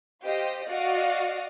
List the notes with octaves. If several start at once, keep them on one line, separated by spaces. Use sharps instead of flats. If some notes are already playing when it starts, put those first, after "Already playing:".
G4 C5 D#5 F5
F#4 D5 D#5 F5 F#5